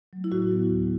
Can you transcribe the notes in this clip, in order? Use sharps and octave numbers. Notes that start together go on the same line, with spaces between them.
F#3 A3
E4
A2 F#4
F#3 B3
D2